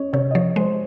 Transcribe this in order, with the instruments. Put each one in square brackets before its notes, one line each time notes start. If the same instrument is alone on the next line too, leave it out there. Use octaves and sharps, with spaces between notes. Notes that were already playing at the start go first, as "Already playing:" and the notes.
Already playing: [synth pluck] C#4 [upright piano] C#5 D#5
[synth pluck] C3 [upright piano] C#5
[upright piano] D#5
[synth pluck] F3 [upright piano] C#5
[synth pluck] G#3 [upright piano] C5